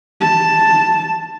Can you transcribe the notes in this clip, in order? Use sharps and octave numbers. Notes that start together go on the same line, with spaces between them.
A5